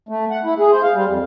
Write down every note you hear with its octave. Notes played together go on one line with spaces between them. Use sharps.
A3
F#5
E4
G#4
C5
F5
G3
F2